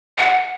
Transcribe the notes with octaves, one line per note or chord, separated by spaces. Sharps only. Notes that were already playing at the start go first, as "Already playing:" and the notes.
F#5